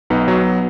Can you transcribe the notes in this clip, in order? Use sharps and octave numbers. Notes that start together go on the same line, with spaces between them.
B1 B3 D#4
F#3